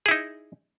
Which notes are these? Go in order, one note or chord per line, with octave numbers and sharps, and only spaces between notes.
D#4 E4 G#4